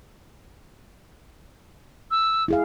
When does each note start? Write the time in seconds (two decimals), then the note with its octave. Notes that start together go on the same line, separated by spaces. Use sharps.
2.11 E6
2.48 E4 G#4 F5